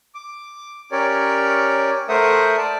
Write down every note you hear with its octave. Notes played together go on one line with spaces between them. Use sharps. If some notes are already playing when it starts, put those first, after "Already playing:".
D6
C#4 G4 A#4 C#5 D5
A3 A#4 C5 E5 F#5 D#6
D5 A5